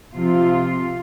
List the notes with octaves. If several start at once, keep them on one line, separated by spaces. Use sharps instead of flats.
C3 F3 F4